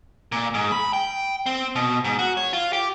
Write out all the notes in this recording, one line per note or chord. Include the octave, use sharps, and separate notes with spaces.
A#2
G#2
B5
G5
C4
B2
G#2
F#4
C#5
F4
G4